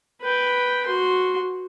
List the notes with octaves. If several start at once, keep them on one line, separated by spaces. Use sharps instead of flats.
B4 G5
F#4 C6